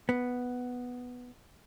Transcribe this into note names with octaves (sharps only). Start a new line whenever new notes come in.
B3